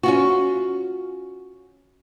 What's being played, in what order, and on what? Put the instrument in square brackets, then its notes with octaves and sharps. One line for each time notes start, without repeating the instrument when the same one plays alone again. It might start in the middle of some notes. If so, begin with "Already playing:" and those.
[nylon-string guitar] C#4 F4 F#4